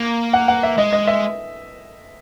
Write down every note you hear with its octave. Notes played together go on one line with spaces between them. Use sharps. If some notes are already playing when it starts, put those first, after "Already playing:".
Already playing: A#3
F#5
F#5
E5
G#3 D#5
D#5
E5